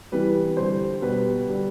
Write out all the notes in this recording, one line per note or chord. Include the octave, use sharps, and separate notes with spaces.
C3 E3 G3 B4
D3 G3 C5
B2 G3 B4
D3 G3